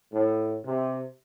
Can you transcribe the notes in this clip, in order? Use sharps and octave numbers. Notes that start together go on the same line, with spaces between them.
A2
C3